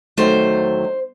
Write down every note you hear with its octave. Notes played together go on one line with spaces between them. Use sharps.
E2 D#3 F#3 A3 C5